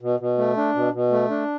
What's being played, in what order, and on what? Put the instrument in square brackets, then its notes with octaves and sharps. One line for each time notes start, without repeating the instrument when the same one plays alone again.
[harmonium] B2
B2
A3
D4
B2
B2
A3
D4